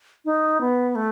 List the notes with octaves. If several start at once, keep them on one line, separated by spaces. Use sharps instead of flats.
D#4
B3
A3